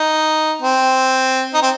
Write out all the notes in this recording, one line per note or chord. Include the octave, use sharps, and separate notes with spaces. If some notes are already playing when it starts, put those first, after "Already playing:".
Already playing: D#4
C4
D#4
C4